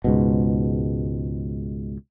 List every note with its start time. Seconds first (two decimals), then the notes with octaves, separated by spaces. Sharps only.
0.04 C#2 G#2 B2